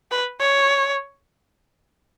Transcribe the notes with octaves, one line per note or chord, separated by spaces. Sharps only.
B4
C#5